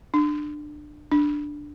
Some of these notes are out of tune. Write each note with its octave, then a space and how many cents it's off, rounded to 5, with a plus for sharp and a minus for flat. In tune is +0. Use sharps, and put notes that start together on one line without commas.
D4 +25
D4 +5